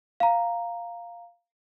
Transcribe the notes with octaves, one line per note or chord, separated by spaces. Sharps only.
F5 A#5